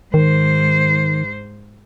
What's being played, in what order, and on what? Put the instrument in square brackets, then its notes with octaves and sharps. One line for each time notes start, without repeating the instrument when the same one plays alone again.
[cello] G#2 C5 [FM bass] D#3